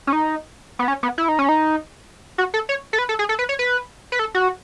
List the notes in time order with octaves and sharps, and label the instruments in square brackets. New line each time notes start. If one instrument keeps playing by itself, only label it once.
[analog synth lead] C#4
D#4
B3
C#4
B3
E4
D#4
C#4
D#4
F#4
A4
C#5
A4
B4
A4
G#4
A4
B4
C#5
B4
B4
A4
F#4